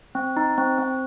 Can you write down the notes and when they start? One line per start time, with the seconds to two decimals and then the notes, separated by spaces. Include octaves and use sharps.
0.15 C4
0.37 D#4
0.58 C4
0.78 C4